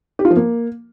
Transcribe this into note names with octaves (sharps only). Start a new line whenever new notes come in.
G4
F4
F3
A#3